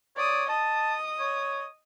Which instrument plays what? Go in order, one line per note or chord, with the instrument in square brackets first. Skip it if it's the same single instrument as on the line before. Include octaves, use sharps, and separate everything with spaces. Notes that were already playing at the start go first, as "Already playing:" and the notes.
[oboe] C#5 [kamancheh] D5 D#6
[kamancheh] D#5 D#6 [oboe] A5
[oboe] C#5